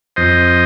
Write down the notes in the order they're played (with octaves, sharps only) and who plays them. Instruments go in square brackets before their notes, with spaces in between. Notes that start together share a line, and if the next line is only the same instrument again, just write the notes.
[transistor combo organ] F2 C5 D#5